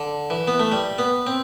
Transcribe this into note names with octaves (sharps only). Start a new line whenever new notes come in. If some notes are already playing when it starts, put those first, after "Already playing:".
Already playing: D3
E3
B3
A3
G3
B3
C4